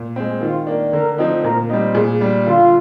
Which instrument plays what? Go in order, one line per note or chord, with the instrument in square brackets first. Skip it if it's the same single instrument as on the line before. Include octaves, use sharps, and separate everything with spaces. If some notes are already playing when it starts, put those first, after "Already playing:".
Already playing: [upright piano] A#2
G#3 C4
[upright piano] D#3 [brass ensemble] F4
[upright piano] A#3 D4
[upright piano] D3 [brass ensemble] A#4
[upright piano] F3 C4 D#4
[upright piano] A#2 [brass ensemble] A#4
[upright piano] G3 C4 D#4
[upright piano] A#2 [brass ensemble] G#4
[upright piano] G3 D4
[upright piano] D3 [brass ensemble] F4